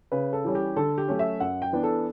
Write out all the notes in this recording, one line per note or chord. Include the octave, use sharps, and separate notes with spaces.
C#3 B4
A4
E3 G3 C#4
G4
D3 A4
G4
F#3 A3 C#4
E5
F#2 F#5
G5
E3 B3 D4
A4